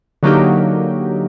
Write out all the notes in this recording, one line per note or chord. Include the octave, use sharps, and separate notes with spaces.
D3 F#3 A#3 D#4 G4